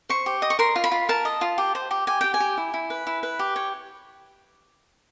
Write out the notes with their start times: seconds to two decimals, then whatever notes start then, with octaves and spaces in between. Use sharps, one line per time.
0.09 C5 C#6
0.26 G4
0.42 D#5
0.50 C#6
0.59 A#4 C6
0.76 F4
0.84 B5
0.92 F4
1.09 A#4 A5
1.25 D#5
1.41 F4
1.58 G4
1.75 C5
1.91 G4
2.07 G4 G#5
2.21 G4 G5
2.34 G#5
2.40 G4
2.57 E4
2.74 E4
2.90 B4
3.07 E4
3.23 B4
3.39 G4
3.56 C#5